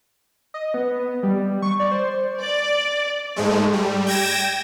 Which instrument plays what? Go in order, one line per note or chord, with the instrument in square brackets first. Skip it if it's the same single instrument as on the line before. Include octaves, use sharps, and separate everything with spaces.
[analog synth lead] D#5
B3
G3
C#6
D5
C5
[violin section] D5
[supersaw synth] G#2 G#3 A3
G3
G5 G#6 A#6 E7